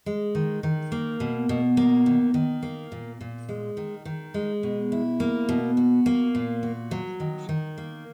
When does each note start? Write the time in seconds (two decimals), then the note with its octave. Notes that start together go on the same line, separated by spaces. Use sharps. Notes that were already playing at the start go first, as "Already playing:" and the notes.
0.06 G#3
0.35 D#3
0.63 D#3
0.92 A#3
1.20 B2
1.49 B2
1.77 A#3
2.06 D#3
2.34 D#3
2.63 A#3
2.92 A#2
3.21 A#2
3.49 G#3
3.77 D#3
4.05 D#3
4.34 G#3
4.63 B2
4.92 E4
5.20 A#3
5.49 B2
5.77 F#4
6.06 A#3
6.35 A#2
6.63 F#4
6.91 F#3
7.20 D#3
7.49 D#3
7.78 A#3